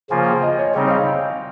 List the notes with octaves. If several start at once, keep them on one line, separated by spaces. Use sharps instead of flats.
C#3 F3 A#3 F4 G#5
G5
D#5
C#5
C#3 G3 C4 D#4 C#5
D#5
F5
G5